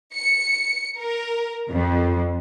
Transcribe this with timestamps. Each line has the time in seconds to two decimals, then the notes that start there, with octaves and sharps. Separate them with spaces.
0.15 C#7
0.99 A#4
1.70 F2